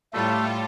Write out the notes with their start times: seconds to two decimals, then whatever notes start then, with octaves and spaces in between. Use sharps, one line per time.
0.13 A2 G3 A3 F4 A4